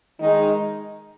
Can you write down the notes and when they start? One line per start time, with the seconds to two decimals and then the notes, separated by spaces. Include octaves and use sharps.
0.19 D#3 G#3 D#4